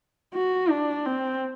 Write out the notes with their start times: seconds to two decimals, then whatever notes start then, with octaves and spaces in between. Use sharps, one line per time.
0.34 F#4
0.70 D4
1.06 C4